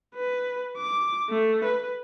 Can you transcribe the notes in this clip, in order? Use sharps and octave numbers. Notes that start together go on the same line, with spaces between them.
B4
D6
A3
B4